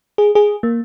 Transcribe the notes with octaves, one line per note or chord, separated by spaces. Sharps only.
G#4
G#4
A#3